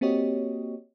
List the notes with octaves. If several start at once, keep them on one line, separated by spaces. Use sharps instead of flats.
A#3 C4 F#4 G4 C#5 D#5